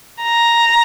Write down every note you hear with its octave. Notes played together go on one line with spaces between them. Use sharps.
A#5